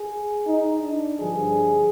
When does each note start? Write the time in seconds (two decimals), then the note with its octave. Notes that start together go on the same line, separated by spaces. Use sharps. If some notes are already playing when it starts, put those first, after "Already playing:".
Already playing: G#4
0.47 D#4
0.82 D4
1.18 G2 D3 F3 G#4